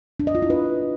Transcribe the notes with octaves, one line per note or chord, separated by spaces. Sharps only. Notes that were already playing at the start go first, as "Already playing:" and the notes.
D4
D#5
F4
E4
B4